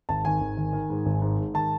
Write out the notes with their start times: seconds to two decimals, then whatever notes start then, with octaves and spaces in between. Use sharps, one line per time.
0.09 G#1 A5
0.25 D#3 G#5
0.40 G#1
0.57 D#3
0.73 D#3
0.90 G#2
1.06 G#1
1.22 G#2
1.38 G#2
1.54 D#3 A5